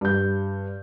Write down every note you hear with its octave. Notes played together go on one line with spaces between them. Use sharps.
G2 G6